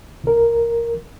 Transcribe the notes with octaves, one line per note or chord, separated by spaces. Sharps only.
C2 A#4